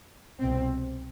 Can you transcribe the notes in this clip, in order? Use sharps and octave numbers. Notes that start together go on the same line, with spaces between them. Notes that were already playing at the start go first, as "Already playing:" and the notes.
C2 B2 C4